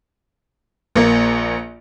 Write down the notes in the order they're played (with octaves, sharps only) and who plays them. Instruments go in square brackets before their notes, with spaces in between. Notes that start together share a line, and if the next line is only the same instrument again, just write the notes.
[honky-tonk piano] A#1 A#3